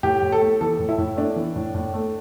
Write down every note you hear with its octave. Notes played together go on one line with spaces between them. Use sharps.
A2 G4
A2
A4
A3
E3 A4
A2
E4
A2
A3 D4
E3
A2
A2
A3